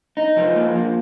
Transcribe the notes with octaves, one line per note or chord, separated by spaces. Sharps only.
D#4
F3
A#3
F3